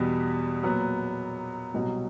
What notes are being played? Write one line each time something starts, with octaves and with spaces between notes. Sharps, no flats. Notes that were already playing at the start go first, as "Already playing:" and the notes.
Already playing: E2 B2 G3 B3
A#2 F#3 B3
C2 B2 F#3